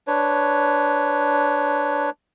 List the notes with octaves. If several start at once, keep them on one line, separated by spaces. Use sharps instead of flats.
D4 B4 C#5